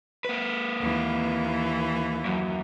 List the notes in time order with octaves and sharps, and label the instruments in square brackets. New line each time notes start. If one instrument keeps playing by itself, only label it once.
[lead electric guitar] A#3 B4
[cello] D#2 E3
[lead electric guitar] F#2